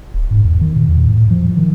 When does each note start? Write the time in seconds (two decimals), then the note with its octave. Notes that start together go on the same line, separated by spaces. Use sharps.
0.14 D1
0.31 G#2
0.45 E2
0.61 D#3
0.76 A#2
0.89 E2
1.06 A2
1.31 F3
1.57 D#3